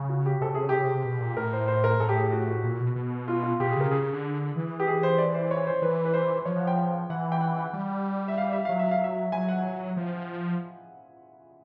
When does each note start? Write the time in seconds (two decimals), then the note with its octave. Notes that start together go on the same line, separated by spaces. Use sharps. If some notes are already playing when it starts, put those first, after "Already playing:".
Already playing: C#3
0.09 F#4
0.26 G4
0.41 C3 A4
0.48 C#3
0.55 C3 G#4
0.63 C#3
0.69 C3 G4
0.77 C#3
0.83 C3 G#4
1.05 B2
1.20 A#2
1.37 A2 A#4
1.53 C5
1.68 C5
1.84 A#4
2.00 A2 A4
2.09 G4
2.17 G#4
2.32 F#4
2.48 F#4
2.63 A#2
2.80 B2
2.96 B2
3.28 F4
3.43 F4
3.60 B2 G4
3.70 G#4
3.76 C#3 A#4
3.91 C#3 G#4
4.02 C#3
4.13 D3
4.56 E3
4.80 G4
4.87 G#4
5.03 C5
5.18 D5
5.35 C5
5.51 C#5
5.67 C5
5.82 E3 B4
6.05 B4
6.14 C5
6.39 C5
6.45 F3 C#5
6.56 F#5
6.67 G5
6.77 G5
7.10 E3 F#5
7.32 G5
7.41 F#5
7.58 F#5
7.73 G3
8.28 E5
8.38 F5
8.53 E5
8.65 F#3 F5
8.79 E5
8.91 F5
9.04 E5
9.32 F#3 G#5
9.49 F#5
9.97 F3